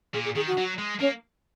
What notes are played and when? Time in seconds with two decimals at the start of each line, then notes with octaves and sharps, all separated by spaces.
0.14 A#2 G#4
0.25 G#4
0.36 D#3 G#4
0.47 F#4
0.57 F#3
0.78 G#3
1.00 A#3 C#4